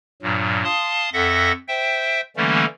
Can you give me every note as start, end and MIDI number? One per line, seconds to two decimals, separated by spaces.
0.22 0.64 43
0.22 0.64 46
0.22 0.64 54
0.64 1.10 77
0.64 1.10 81
0.64 1.10 84
0.64 1.10 87
1.13 1.52 41
1.13 1.52 69
1.13 1.52 76
1.13 1.52 78
1.13 1.52 94
1.68 2.21 72
1.68 2.21 76
1.68 2.21 79
2.37 2.65 50
2.37 2.65 52
2.37 2.65 55
2.37 2.65 57
2.37 2.65 58
2.37 2.65 61